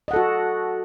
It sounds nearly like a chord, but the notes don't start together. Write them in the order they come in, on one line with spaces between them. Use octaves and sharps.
D#5 F#5 A4 F#4